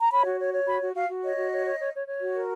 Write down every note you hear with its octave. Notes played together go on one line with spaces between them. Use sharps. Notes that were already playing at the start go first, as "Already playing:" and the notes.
A#5
C#5 B5
F#4
C#5
C#5
F#4 B5
F#4
F#4 F5
F#4
C#5 D#5
F#4
C#5
C#5
C#5
C#5
C#5
F#4
A#4